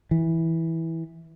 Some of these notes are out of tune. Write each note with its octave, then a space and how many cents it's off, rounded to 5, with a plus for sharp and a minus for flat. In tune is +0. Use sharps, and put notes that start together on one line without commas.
E3 -10